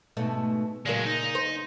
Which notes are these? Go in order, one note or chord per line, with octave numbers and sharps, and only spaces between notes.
G#2 B2 A3
A#2 C#3 F#3 G#3 A#4
D#4
C5